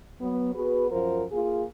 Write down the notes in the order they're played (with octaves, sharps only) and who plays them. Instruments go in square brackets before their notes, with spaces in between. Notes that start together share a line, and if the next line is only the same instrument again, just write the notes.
[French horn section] F#3 B3
B3 F#4 G#4 B4
F#2 F3 F4 A#4 C5
A#3 F4 G#4